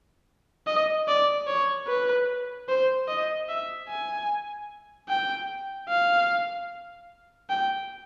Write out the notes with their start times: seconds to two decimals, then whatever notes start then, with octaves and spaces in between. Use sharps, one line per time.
0.67 D#5
1.08 D5
1.47 C#5
1.88 B4
2.69 C5
3.08 D#5
3.49 E5
3.89 G#5
5.09 G5
5.89 F5
7.50 G5